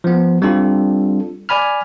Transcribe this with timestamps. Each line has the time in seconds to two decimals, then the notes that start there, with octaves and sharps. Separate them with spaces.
0.04 F3 B3
0.42 G3 C4 D4 F4 A4
1.49 D5 G#5 B5 F6